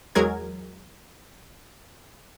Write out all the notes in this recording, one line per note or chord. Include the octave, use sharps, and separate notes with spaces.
E2 F#3 G#3 G#4 A#4 G#6